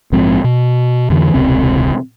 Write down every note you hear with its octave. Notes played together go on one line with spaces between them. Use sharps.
A#1 G#2 F3 C4
B2
F2 D3 E3
E1 C#2 C3 C4